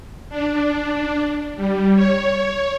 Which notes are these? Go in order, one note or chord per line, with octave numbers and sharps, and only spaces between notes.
D4
G3
C#5